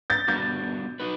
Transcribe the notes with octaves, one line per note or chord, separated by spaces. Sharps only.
G6 A6
G3 B3 D4 F#4 G6 A6
D#4 F#4 B4